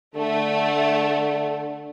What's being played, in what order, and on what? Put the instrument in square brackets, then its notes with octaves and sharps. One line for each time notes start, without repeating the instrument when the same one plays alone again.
[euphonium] D3 [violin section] A3